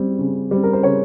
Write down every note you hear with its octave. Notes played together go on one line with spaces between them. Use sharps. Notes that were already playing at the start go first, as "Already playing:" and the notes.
Already playing: G3 C4
C#3
G3 C4
A#4
C5
C#3 C#5